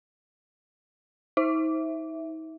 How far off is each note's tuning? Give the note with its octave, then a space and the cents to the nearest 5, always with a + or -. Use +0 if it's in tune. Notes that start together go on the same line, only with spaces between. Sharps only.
D#4 +40 E5 +0